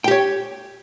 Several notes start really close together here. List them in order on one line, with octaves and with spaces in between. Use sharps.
G5 G4 C#5